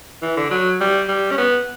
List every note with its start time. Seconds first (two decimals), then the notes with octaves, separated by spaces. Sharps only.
0.22 E3
0.37 D3
0.51 F#3
0.81 G3
1.09 G3
1.31 C#4
1.38 B3